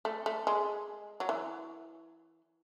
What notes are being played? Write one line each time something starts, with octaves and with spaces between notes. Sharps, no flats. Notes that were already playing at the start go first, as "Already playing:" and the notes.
A3
A3
G#3
F#3
E3